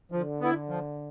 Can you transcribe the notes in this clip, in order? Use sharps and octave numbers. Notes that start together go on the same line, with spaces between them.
D3 F3
B3 E4
F3